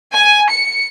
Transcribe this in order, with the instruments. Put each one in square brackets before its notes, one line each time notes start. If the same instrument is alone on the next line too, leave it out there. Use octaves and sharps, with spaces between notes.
[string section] G#5
C#7